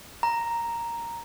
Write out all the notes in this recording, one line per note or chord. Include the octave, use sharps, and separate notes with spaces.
A#5